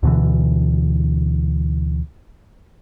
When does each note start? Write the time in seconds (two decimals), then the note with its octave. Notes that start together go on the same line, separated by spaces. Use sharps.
0.03 D2 B2 D3 E3